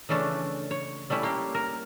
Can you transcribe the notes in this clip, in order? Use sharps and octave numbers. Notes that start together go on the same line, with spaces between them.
C#3 E3 A3 C#4 D4
C#5
G3 A3 C#4 E4
A#3 G4
A#4